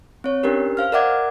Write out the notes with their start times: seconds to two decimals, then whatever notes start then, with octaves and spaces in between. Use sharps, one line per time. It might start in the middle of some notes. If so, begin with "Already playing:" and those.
0.24 C4 C#5
0.43 C#4 D4 G4 A#4 B4
0.77 C5 F5 F6
0.92 A#4 D5 E5 F#5 D6 G#6